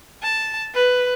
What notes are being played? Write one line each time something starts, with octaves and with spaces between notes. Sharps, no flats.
A5
B4